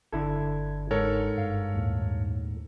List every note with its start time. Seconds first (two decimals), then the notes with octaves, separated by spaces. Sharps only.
0.12 G1 D3 E4 A4 G#6
0.91 G#2 A4 A#4 C#5 C#7
1.37 G2 F5
1.75 D#2 A2